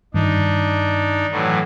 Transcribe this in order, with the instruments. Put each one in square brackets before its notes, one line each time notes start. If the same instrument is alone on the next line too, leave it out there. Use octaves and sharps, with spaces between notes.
[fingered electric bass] G2 D#3 [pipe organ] D4 D#4
[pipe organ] A2 E3 F#3